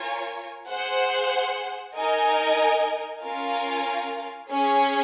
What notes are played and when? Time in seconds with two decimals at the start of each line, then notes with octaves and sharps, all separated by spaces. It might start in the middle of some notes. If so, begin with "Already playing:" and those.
Already playing: F4 A#4 C#5 G#5
0.67 G#4 C5 F#5
1.95 D#4 A#4 D#5 G#5
3.22 C#4 F4 A#4 F5 G#5
4.49 C#4 G#4 C#5